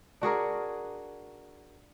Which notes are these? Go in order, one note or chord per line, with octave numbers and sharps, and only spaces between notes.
D4 F#4 G#4 A#4